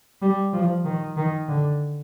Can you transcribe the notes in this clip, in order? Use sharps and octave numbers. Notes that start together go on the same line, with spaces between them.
G3
F3
D#3
D#3
D3